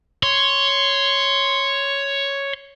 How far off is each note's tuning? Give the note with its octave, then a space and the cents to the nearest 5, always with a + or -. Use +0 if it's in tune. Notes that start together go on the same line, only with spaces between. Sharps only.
C#5 +0 C6 +0